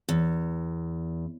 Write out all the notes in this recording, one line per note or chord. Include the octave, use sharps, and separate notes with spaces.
E2